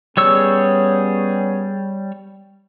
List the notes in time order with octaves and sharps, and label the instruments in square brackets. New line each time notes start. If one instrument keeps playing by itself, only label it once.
[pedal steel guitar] G3 C#5 E6 [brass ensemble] B3 C#4 G#4